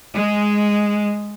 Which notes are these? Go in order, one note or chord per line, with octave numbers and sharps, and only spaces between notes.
G#3